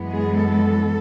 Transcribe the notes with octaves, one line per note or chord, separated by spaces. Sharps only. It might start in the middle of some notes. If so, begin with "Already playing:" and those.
Already playing: F#2 E3 G#3 B3
G#4
A4